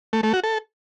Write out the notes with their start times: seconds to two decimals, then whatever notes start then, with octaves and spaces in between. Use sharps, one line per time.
0.13 A3
0.23 A3
0.33 F#4
0.44 A4